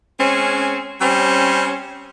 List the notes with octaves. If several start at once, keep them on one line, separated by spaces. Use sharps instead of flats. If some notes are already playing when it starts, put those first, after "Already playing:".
G#3 C4 C#4
G3 C4 C#4